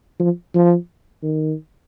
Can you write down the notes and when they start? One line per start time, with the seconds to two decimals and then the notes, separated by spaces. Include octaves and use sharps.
0.20 F3
0.55 F3
1.23 D#3